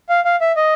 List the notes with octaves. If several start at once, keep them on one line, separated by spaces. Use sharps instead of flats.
F5
F5
E5
D#5